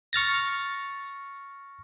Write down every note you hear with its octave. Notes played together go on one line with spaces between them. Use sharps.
C#6 F6 A6 A#6